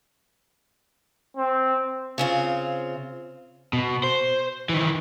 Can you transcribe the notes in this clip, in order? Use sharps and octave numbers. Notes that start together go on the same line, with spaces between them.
C4
C#3 C4 F4
B2
C5
D#3 E3